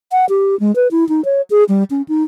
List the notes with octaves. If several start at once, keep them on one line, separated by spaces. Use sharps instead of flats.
F#5
G4
G#3
B4
E4
D#4
C#5
G#4
G3
C#4
D#4